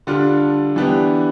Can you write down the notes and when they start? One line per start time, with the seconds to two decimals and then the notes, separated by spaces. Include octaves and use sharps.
0.07 D3 G3 D4 F4
0.76 E3 B3 D4 G4